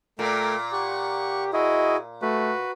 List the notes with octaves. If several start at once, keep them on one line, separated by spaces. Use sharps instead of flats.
A#2 A3 A#4 G5
G4 F#5 C#6
E4 F#4 G#4 D#5
A3 F#4 B4